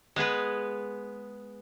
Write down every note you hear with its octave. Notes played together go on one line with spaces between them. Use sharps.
G#3 B3 G#4 B4